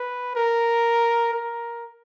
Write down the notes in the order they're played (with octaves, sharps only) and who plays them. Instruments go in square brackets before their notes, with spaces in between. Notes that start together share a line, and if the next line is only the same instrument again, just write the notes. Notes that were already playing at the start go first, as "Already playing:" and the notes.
Already playing: [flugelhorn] B4
A#4
A#4